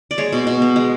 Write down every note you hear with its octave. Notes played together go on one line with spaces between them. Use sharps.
D5
G#3 C#5
B2
B2
B3
G#3